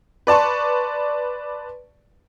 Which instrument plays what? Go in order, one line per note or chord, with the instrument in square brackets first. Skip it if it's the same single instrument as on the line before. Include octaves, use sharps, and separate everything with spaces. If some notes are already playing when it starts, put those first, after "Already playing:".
[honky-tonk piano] B4 D5 A5 C6 C#6